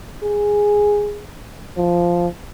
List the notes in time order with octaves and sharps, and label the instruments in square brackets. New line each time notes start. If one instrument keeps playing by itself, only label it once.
[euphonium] G#4
F3